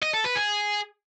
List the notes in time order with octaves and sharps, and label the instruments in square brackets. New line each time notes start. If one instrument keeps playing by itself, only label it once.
[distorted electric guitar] D#5
A4
B4
G#4